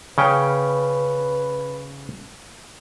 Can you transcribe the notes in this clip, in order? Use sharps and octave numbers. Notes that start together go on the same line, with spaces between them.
C#3 C#4 B4 G5